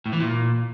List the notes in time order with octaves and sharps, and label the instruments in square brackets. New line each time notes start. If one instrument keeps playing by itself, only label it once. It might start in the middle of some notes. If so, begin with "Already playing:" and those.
[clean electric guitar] A2
E3
A#2